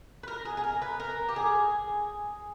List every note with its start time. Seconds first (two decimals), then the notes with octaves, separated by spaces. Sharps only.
0.23 B4
0.28 A#4
0.45 G#4
0.57 G#4
0.64 A#4
0.82 B4
1.00 A#4
1.29 G4
1.36 G#4